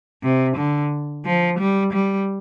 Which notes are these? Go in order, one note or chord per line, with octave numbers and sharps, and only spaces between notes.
C3
D3
F3
G3
G3